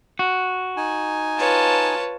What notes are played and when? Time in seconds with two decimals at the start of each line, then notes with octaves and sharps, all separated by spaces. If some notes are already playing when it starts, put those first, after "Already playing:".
0.19 F#4
0.77 D#4 G#5
1.38 F4 B4 C#5 A5